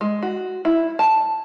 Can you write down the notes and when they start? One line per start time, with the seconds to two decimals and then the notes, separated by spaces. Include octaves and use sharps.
0.01 G#3
0.23 F#4
0.65 E4
0.99 A5